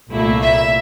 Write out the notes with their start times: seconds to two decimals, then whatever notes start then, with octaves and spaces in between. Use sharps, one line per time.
0.10 C2 A#2 A3 E4
0.42 E5